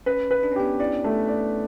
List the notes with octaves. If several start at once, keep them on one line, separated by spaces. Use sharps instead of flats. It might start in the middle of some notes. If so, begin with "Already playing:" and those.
C#4 B4
B4
D4
C#4
B3 D4 G4
C#4 E4 D5
A3
D5